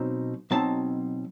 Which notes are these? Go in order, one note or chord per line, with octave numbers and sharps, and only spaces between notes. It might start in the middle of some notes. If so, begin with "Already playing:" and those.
Already playing: B2 F#3 C4 D#4
B2 F#3 C4 D#4 A5